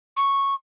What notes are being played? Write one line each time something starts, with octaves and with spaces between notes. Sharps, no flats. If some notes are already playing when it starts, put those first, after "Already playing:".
C#6